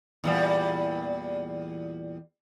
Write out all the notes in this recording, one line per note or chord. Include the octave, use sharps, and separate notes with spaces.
E2 A#2 G3